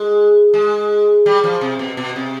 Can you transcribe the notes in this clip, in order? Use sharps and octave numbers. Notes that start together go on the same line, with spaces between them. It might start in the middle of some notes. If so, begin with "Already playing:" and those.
Already playing: G#3
G#3
G3
F3
C3
B2
B2
C3